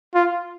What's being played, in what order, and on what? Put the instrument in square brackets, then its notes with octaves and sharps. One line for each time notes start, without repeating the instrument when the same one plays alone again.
[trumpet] F4